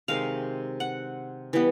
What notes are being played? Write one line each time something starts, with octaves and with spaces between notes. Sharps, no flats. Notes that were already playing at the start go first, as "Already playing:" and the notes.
C3 D#3 G#3 F5
F#5
E3 G3 B3